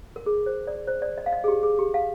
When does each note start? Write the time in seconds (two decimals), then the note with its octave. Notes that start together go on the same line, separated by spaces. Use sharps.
0.16 A#4
0.26 G#4
0.46 C5
0.67 D5
0.87 C5
1.02 D5
1.18 D#5
1.26 F5
1.32 D#5
1.44 G#4
1.48 G4
1.63 G#4
1.79 G4
1.94 F5